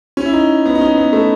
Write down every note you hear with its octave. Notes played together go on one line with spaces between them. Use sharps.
C#4
E4
D#4
B3
D#4
C#4
B3
A3